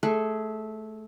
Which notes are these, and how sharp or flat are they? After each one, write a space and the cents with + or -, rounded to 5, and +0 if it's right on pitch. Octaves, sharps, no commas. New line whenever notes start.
A3 -15 G#4 +0